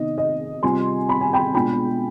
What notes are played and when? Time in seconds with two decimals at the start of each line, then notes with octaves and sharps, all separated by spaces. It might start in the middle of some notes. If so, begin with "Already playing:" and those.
Already playing: C3 D#3 B3 D#4 D#5
0.18 D#5
0.63 C3 G3 C4 F4 G#5 C6
1.09 B5
1.21 G#5
1.33 G5 B5
1.55 B2 G#3 D4 F4 G5 B5